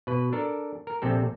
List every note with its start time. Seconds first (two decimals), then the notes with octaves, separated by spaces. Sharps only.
0.07 B2 B4
0.33 D4 A4 A#4
0.87 A#4
1.02 A#1 C3 C4 A4